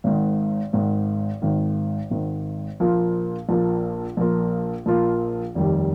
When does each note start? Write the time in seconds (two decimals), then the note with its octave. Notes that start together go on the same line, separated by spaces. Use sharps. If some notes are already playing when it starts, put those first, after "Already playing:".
0.04 G#1 G#2 D#3
0.73 G#1 G#2 D#3
1.42 G#1 G#2 D#3
2.11 G#1 G#2 D#3
2.80 A#1 A#2 F3 A#3 F4
3.49 A#1 A#2 F3 A#3 F4
4.17 A#1 A#2 F3 A#3 F4
4.86 A#1 A#2 F3 A#3 F4
5.55 F1 D#2 D#3 G3